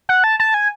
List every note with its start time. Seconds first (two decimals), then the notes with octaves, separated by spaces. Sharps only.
0.09 F#5
0.24 A5
0.40 A5
0.54 G#5